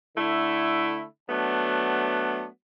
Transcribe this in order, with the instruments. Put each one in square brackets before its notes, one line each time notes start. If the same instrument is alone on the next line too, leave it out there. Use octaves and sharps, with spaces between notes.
[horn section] D3 A3 E4
F#3 A3 B3 D4